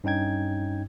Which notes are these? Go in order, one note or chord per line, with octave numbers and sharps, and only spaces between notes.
G2 C#4 D#4 G5 G#6